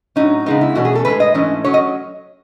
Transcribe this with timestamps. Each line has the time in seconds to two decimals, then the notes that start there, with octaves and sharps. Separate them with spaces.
0.16 A2 F#3 C#4 D#4
0.46 C#3 G#3 B3 D#4
0.61 E4
0.75 E2 B2 A3 C#4 F#4
0.85 G#4
0.95 A4
1.05 A2 E3 B4
1.10 G#3
1.20 D#5
1.34 G#2 E3 A3 C#4
1.64 F#3 C#4 C#5
1.74 D#5